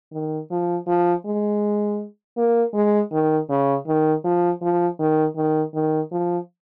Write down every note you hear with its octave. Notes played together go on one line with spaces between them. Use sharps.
D#3
F3
F3
G#3
A#3
G#3
D#3
C#3
D#3
F3
F3
D#3
D#3
D#3
F3